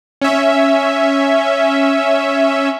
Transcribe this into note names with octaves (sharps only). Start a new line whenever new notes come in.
C#4 E5